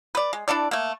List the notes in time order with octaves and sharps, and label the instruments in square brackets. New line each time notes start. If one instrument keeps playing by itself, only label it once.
[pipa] B4 D5
G#3
D4 E4 A4 D5
A3 A#3